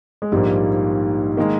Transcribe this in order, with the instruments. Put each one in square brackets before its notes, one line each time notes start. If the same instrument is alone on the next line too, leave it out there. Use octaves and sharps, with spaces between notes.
[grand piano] G#3
[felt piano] A#1 G#2 F3 A#3 [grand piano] G3
[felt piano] D#3 G#3 [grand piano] A#3